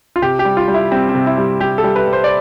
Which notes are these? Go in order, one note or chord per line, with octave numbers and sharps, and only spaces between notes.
F4
C3 G4
G4
G3
F4
G3
E4
G3 C4
C4
C3
E4
G3
G3 G4
A4
G3
B4
G3
C5
D5